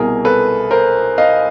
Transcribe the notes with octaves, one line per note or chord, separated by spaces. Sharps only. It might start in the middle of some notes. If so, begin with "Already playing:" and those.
Already playing: C2 B2 G#4 A#4
A4 B4
A#4 C5
D#5 F5